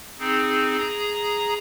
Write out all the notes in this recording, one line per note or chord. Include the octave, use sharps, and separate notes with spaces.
C4 D#4 G#4
G#4 A#5 D#6